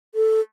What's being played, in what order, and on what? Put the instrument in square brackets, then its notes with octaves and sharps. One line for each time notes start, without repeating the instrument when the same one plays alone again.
[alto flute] A4